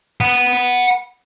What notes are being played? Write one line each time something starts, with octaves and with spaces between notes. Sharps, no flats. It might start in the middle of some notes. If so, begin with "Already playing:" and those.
F#5 B5